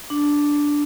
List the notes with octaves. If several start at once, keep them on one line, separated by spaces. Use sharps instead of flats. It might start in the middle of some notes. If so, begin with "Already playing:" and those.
D4